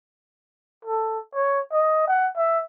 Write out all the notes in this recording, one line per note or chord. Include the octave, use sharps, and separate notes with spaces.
A4
C#5
D#5
F#5
E5